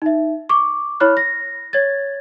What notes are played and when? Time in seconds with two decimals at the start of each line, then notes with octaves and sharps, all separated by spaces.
0.02 D#4 E5
0.49 C#6 D6
1.00 E4 C#5 B5 F6 F#6
1.17 A#6
1.73 C#5 G#6 A6